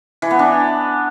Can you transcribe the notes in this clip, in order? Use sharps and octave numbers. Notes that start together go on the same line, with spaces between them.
E3
B3
D4